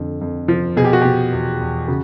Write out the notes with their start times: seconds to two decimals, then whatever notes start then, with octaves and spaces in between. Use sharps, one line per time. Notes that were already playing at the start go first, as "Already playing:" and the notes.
Already playing: F2 D3
0.21 F2
0.48 F3
0.77 B2 G#4
0.84 G4
0.93 F#4
1.02 B2 G4
1.33 E2
1.61 E2
1.88 C#3 F#4